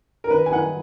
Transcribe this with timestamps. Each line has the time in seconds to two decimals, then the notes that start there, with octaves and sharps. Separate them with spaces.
0.24 A#4
0.30 D#3 B4
0.46 G#5
0.52 D#3 F#5